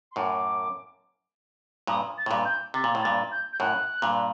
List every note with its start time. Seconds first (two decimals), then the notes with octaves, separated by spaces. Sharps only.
0.11 C6
0.16 F#2 A2 D6
1.87 G2 A#2 D#6
2.17 A6
2.26 A2
2.31 G2 A#2
2.45 G6
2.74 C3 A6
2.84 A#2
2.95 A2
3.02 G2 A#2 A6
3.31 G6
3.53 G6
3.59 F#2 A2 F#6
4.02 G2 A#2